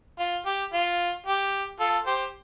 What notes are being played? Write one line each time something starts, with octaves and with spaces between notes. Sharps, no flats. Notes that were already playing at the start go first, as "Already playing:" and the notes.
F4
G4
F4
G4
F4 A4
G4 C5